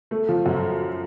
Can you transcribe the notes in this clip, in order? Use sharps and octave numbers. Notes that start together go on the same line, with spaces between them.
A3
F3
F#2